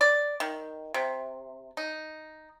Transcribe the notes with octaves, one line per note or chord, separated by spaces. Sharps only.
D5
D#3
C3
D#4